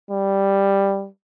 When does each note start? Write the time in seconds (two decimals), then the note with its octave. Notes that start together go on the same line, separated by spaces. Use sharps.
0.10 G3